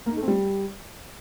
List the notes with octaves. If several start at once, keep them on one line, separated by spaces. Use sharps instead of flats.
A#3
D#4
A3
C4
G3